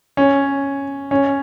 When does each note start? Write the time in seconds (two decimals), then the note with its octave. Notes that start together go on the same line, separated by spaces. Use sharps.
0.17 C#4
1.11 C#4